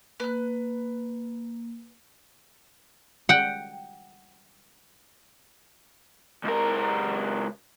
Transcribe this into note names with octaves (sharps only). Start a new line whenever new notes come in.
A#3 B4 F#6
F#5 G5
C#2 A#4